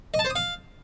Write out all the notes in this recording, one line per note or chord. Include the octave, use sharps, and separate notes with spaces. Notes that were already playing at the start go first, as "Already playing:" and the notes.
D#5
A5
C5
D#6
F5